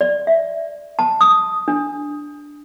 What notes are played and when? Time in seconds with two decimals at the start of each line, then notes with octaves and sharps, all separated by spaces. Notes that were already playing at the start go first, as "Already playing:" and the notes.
0.01 D5
0.27 E5
0.99 A5
1.21 D#6
1.68 D4